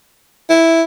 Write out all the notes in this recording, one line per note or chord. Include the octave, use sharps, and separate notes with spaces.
E4